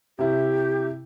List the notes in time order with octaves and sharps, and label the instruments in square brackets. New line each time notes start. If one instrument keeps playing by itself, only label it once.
[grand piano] C3 E4 [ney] G4